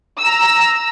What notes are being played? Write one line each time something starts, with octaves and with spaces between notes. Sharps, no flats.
A#5 E6